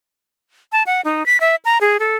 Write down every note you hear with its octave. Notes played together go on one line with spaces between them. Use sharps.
A5
F#5
D#4
B6
E5
A#5
G#4
A4